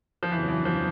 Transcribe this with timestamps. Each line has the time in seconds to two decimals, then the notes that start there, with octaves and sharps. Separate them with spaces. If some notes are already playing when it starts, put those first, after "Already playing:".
0.23 F3
0.32 F2 C#3 E3 F#3 B3 D4
0.48 E3
0.65 F3